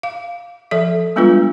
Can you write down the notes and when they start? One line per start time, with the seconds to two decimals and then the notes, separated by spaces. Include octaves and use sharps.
0.03 F5
0.71 F3 A4 E5
1.16 G3 G#3 B3 D4 F4 B4